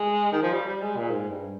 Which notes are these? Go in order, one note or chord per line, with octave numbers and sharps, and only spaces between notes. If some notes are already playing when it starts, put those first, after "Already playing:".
Already playing: G#3
D#3
F3
G3
G3
G#3
A#2
G#2
G2